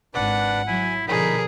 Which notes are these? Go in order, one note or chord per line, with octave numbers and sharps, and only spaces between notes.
G#1 D4 B4 D5 F#5
F#3 E4 G#5
B2 D3 F3 D#4 G#4 A#4 B5